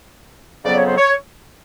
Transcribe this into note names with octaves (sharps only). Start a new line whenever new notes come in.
F2 C#3 F#3 B3 D5
C#5
C5
C#5